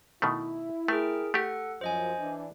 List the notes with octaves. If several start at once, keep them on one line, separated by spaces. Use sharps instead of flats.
B2 D#3 A3 E4
A3 G#4 A#4 G5
A3 G4 A4 F#5
F#2 F3 C5 D#5 G#5
E3 D4